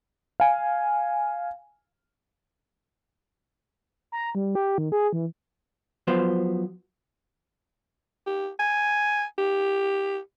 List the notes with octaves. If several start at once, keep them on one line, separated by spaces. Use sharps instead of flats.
F5 G#5
A#5
G3
G4
D#3
G#4
E3
F3 F#3 B3 C5
G4
G#5
G4